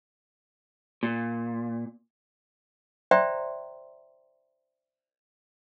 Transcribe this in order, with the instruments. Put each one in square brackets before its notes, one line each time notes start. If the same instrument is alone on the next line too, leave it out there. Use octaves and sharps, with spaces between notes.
[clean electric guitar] A#2
[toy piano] C5 D5 E5 G5 A#5 C6